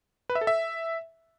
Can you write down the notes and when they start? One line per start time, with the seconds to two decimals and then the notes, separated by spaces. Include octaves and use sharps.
0.30 B4
0.35 E5
0.41 A4
0.47 E5